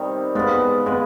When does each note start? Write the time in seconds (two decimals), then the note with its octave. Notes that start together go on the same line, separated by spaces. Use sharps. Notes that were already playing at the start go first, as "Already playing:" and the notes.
Already playing: C3 D#3 G3
0.35 G#3 B3 F4 B4
0.86 G#3 B3 F4 B4